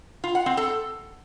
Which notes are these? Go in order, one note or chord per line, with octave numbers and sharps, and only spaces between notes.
F4
F#5
C4
A4